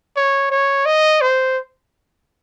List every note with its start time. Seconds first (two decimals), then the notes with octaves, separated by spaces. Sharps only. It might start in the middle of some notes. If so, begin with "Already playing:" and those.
0.16 C#5
0.51 C#5
0.86 D#5
1.21 C5